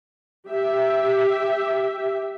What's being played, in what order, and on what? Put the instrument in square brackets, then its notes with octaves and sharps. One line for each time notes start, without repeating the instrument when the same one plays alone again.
[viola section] G4 E5